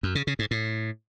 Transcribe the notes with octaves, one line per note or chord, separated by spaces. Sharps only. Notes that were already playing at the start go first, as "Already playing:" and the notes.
F#2
C#3
C#3
G#2
A2